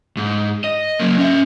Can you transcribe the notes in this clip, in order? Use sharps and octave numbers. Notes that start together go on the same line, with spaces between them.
G#2
D#5
F#3 A#3
C#4 E5